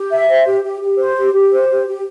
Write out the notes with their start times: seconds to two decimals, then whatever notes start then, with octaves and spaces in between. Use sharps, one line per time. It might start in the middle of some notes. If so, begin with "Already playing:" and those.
Already playing: G4
0.11 E5
0.29 C5
0.46 G4
0.63 G4
0.82 G4
0.98 C5
1.16 G4
1.33 G4
1.51 C5
1.70 G4
1.87 G4